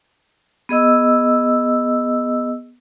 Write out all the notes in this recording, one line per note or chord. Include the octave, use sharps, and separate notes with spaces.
B3 G#4 D#5 E6